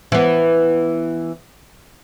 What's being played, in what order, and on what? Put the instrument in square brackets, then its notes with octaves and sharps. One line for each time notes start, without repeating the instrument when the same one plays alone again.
[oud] E3 B3